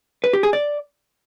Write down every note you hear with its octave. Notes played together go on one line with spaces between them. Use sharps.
B4
G4
G#4
D5